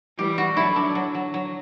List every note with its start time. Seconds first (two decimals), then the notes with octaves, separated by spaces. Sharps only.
0.17 E3 G3 G4
0.38 F#4
0.56 D3 F#3 E4
0.76 D4
0.95 F#3
1.15 F#3
1.34 F#3